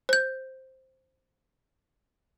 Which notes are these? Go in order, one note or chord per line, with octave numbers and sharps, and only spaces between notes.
C5 G6